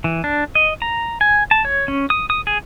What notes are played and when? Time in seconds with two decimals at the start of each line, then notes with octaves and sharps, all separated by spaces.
0.04 E3
0.24 D4
0.55 D#5
0.82 A#5
1.21 G#5
1.51 A5
1.65 C#5
1.88 C#4
2.10 D#6
2.30 D#6
2.47 G#4